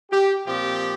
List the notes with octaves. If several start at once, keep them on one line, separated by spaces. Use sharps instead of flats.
G4
A#2 F3 C4 G4